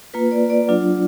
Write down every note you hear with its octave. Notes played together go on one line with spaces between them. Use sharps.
A#3 F4 B4
D5
D5
F#3 D4 F4